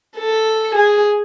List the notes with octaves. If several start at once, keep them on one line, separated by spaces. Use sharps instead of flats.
A4
G#4